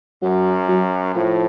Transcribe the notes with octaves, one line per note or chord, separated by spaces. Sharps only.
F#2 F#3
F#3
A2 F3